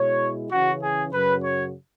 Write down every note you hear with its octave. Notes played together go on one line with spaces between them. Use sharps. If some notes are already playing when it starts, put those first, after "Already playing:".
Already playing: B2 G#3 E4 C#5
C#3 E3 C#4 F#4
G#4
F#2 C#3 F#3 B4
C#5